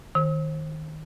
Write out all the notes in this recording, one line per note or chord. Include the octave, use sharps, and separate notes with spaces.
D#3